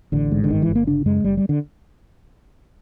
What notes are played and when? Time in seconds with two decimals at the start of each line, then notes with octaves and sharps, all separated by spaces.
0.12 A1 D3
0.32 G#2
0.44 D3
0.50 G1 D#3
0.62 E3
0.69 G1
0.75 A#3
0.87 C#3 D4
1.06 F#2 G#3
1.24 F#1 G3
1.37 G3
1.49 D3